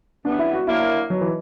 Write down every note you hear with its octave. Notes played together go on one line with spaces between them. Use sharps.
F#2 E3 G3 B3 D4
E4
F#4
D3 F#3 A#3 E4
B2 F#3
E3